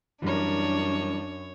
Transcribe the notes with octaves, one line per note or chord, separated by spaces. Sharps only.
F#2 E3 G3 D4 A#4 C#5